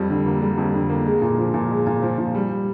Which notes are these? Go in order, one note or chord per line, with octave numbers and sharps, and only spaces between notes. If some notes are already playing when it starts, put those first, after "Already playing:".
Already playing: F2 G3
D3
A#3
G3
F2
D3
A#3
G#3
A#2
F3
A#2
G#3
A#2
F3
A#2
G3